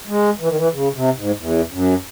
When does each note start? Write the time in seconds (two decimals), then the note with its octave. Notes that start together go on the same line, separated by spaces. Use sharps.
0.07 G#3
0.40 E3
0.48 D#3
0.57 E3
0.73 C#3
0.94 C3
1.16 G#2
1.38 E2
1.71 F#2